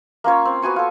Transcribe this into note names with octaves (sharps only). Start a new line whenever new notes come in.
A#3 C#4 F4 C#5
C4
B3 F#4 G#5 C#6
F4 A4